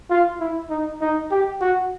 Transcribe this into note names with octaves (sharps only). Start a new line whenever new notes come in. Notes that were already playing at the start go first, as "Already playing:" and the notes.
F4
E4
D#4
D#4
G4
F#4